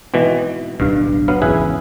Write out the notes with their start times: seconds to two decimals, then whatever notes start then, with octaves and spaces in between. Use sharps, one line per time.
0.14 G#1 B2 E3
0.80 D1 B1 G2 D4 F5
1.28 F#3 B3 F5
1.42 G#1 E2 C#3 E4 G#4 B4